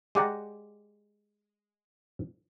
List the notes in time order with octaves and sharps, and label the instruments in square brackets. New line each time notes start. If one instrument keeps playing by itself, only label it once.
[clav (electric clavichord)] G#3 G4 D5 F#5 A#5